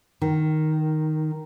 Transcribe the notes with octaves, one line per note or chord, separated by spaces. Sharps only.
D#3